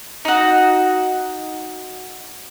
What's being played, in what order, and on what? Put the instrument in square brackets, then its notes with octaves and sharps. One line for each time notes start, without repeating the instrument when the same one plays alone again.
[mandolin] D#4 F#4